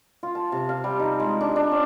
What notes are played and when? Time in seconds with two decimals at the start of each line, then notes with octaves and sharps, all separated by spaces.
0.23 F4
0.35 A5
0.52 C3
0.69 F5
0.84 G3
1.00 D#4
1.20 G#3
1.41 D4
1.56 D4
1.72 C#4